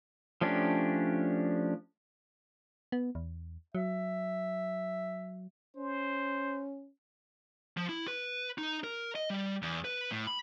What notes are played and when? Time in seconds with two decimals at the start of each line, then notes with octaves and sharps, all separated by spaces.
0.41 F3 A3 C#4 D4 G4
2.92 B3
3.15 E2
3.75 F#3 E5
5.77 C#4 C5
7.77 F3
7.89 E4
8.08 B4
8.58 D#4
8.84 A#4
9.16 D#5
9.30 G3
9.62 E2
9.85 B4
10.12 A2
10.27 B5